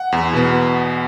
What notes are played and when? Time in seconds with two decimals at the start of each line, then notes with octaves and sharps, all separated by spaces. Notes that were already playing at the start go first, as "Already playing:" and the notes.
Already playing: F#5
0.12 E2
0.33 B2 B3